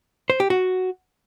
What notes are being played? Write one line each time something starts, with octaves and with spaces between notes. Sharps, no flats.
C5
G4
F#4